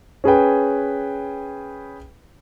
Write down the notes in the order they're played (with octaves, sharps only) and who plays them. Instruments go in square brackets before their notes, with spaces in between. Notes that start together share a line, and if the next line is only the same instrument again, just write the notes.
[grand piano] C#4 G#4 B4 G5